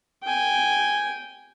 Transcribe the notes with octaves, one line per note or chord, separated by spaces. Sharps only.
G5 G#5